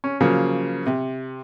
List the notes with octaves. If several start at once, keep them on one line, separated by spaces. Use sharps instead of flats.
C#4
C#3 F3 F#3 A#3
C3